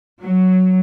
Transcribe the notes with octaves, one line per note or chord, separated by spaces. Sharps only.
F#3